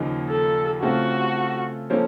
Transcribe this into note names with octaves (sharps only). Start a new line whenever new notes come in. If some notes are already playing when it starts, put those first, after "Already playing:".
Already playing: D#2 C#3 F3 A#3 D#4
A4
C#3 A3 C4 F4 F#4 A4
F3 A#3 C#4 A4 C5